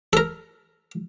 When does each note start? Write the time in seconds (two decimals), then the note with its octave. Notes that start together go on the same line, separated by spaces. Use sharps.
0.13 A4 A#4